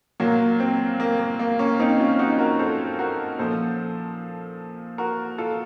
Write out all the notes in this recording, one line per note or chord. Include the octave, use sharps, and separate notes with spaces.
A#2 F#3 A#3
C4
A#3
A#3
A#3
A#3 C#4
C4 D#4
C#4 F4
D#4 F#4
F#4 A#4
A4 C5
F#4 A#4
A#2 F3 A4 C5
F#4 A#4
F4 A4